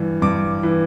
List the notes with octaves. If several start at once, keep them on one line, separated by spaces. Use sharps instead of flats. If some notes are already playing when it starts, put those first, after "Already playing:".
Already playing: G2 E3
G2 D6
E3